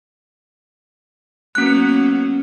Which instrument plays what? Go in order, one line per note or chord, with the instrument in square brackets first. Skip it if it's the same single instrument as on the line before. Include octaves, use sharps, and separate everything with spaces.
[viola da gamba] F#3 A#3 B3 [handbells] C#4 F#6